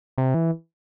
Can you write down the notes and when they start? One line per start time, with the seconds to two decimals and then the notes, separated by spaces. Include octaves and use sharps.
0.18 C3
0.34 E3